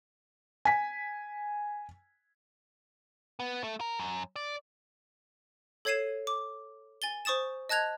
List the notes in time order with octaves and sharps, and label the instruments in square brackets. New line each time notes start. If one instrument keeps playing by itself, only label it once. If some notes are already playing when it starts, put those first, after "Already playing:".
[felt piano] G#5 B6
[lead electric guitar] B3
A3
A#4
F#2
D5
[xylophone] A4 C#5 G#6 C7 D#7 E7
D6
G#5 A6 G7
C5 C#6 D#6 A6 E7
D#5 A5 F#6 G#6 F7